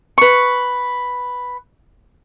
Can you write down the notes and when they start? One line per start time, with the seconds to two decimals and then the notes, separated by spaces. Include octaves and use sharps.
0.18 B4 C#6